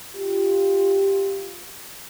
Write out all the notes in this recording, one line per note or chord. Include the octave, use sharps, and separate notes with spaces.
F4 G4